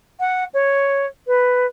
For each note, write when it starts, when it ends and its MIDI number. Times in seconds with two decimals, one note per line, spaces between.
0.20 0.44 78
0.54 1.06 73
1.27 1.66 71